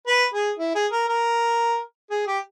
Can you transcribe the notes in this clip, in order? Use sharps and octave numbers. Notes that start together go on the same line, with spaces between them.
B4
G#4
E4
G#4
A#4
A#4
G#4
G4